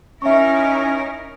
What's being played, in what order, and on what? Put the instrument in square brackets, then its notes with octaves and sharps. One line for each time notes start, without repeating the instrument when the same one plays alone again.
[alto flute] C#4 [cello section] D#4 E4 A#4 [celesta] E5 C#6